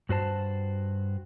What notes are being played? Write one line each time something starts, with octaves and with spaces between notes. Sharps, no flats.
G2 F#4 C5 A5